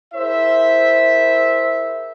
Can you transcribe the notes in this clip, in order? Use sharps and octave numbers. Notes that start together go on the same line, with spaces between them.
E4 G#4 A#4 C5 E5